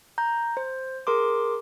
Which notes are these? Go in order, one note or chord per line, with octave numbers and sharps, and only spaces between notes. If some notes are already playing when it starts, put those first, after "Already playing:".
A#5 G6
C5
G#4 A#4 C6 D6